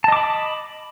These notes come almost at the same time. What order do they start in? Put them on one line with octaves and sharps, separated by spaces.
A5 D#5 D6 B5